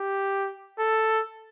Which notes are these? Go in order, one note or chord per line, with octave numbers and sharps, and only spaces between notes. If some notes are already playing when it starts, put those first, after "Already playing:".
Already playing: G4
A4